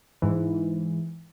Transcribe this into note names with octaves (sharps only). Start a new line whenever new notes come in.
G#2 E3